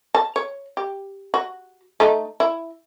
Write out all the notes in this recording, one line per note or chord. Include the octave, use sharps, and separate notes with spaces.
A5
C#5
G4
F#4
A3 D#4
E4